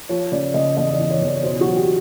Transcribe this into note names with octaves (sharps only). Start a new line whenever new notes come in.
F3 C#5
C#3 D5
C#3 D#5
E2 D#5
D5
E2
C#5
E2
D5
B2 C5
F#4
F#3
G4